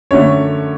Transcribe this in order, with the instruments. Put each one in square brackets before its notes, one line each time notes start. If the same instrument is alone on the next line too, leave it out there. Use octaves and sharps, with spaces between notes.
[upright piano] F#2 D3 A3 C#5